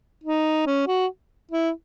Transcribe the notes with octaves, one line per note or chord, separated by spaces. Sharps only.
D#4
C#4
F#4
E4